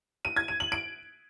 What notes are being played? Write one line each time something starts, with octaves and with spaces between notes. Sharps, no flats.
D#7
G#6
D#7
F#7
D7